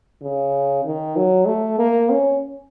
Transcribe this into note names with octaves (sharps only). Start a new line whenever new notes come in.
C#3
D#3
F#3
A3
A#3
C#4